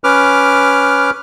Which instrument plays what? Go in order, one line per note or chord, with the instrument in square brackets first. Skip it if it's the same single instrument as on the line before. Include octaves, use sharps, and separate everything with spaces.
[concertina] C#4 B4 D6 F6